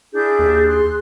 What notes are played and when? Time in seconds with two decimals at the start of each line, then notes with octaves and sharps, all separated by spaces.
0.13 D4 E4 G#4 G6
0.39 D#2
0.67 C6 F#6